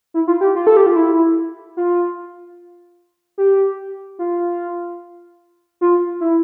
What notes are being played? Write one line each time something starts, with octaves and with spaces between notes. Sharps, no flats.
E4
F4
G4
F4
A4
G4
F4
E4
F4
G4
F4
F4
E4